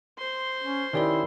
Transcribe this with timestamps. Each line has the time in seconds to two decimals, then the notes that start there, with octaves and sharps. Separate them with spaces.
0.18 C5 C6
0.62 C#4
0.93 D#3 C#4 E4 G4 A#4 D5 G7